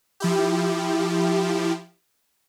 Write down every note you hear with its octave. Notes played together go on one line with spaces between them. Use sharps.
F3 E4 G4